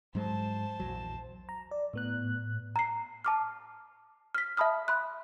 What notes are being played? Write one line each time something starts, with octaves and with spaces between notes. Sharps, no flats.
G#2 F#3 G#3 C5 A5
A#1 E2 F#3
A#5
D5
A2 B3 F#6
A#5 C7
A5 D6 F6
F6 B6
E5 A5 B5 D#6 F6
B5 C6 F#6